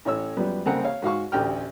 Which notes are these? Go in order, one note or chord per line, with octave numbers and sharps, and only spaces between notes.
A1 A2 C#5 E6
F#2 F3 G3 B3
C2 C#3 A#3 C4 F#5 A#5
C#5 F5
G#2 F#4 F5 C#6
A1 D2 G4 G5 F6